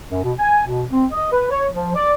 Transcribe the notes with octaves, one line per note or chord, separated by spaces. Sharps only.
F#2
B2
G#5
B2
C4
D#5
B4
C#5
F3
D5